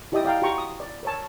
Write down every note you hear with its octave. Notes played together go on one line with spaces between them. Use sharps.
E4 G4 D5 D#5 G5 D#6
D5 F5 G5 A#5
F#4 G4 G5 A#5 C6 C#6
D#6
D5
A#4 C#5 A5